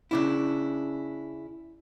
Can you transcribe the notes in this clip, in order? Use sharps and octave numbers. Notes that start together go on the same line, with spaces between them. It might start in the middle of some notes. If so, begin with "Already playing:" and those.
C#3 D4 E4